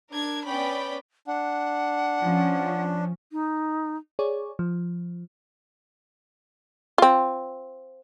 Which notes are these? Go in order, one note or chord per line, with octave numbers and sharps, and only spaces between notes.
D4 A#4 G#6
B3 C#4 D5 G5 B5
D4 F#5
F3 C#4
D#4
G#4 C#5 D5
F3
C4 F4